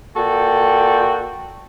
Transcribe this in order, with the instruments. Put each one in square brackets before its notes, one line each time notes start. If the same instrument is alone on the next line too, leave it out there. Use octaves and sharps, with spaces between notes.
[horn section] A#2 F#4 A4 G5